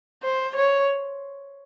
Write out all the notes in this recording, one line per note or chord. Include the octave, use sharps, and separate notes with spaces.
C5
C#5